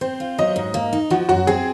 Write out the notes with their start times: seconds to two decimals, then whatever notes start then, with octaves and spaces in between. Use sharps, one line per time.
0.01 C4 C5
0.20 F4
0.38 F#3 D#5
0.56 G#2
0.74 A#3
0.93 D#4
1.10 F3 F#4
1.29 F#2 F#4
1.47 C4 G#4